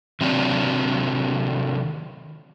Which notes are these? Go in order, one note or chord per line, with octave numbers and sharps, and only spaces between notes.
C3 D#3 F#3 C4 D4